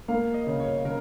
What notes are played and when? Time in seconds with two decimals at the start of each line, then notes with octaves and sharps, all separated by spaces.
0.08 A#3 F5
0.34 D#5
0.47 C#3
0.60 C#5
0.85 C#3 A#4